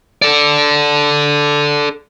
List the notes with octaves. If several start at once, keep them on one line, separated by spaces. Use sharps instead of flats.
A4 D5